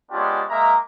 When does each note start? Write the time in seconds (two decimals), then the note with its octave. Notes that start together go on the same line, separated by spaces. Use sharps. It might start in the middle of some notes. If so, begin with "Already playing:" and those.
0.11 G#3 B3 C#4 D4 F4 G4
0.49 G#3 A#3 E5 A#5